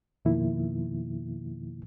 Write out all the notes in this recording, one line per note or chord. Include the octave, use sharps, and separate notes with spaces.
F2 B2 D#3 F3 A#3 E4